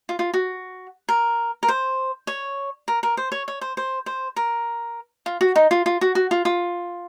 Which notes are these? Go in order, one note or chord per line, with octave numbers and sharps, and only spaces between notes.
F4
F4
F#4
A#4
A#4
C5
C#5
A#4
A#4
C5
C#5
C#5
C5
C5
C5
A#4
F4
F#4
D#4
F4
F4
F#4
F#4
F4
F4